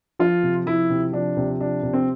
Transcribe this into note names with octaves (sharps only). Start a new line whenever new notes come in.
F3 F4
C3
F3 E4
C3
F3 D4
C3
F3 D4
C3
C4